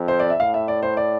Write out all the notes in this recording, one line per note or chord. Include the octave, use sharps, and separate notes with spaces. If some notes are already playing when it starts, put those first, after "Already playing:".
Already playing: F2
C5
D5
E5
A2 F5
E5
D5
C5
D5